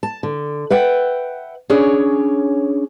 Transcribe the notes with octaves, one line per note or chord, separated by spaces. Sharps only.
A5
D3
B4 E5 F#5 G5
C#4 D4 G#4 C#5